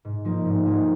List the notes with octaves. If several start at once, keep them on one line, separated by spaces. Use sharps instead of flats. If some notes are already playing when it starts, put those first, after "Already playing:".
G#2
F3 A#3 D#4
G#2
F3 A#3 D#4